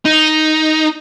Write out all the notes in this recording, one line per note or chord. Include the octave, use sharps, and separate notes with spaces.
D#4